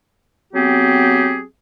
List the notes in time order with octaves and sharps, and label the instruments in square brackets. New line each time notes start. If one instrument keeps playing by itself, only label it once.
[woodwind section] F#3 B3 C4 G4 G#4